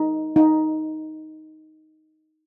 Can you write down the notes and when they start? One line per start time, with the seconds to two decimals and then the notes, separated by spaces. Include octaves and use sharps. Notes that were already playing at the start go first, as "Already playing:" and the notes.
Already playing: D#4
0.36 D#4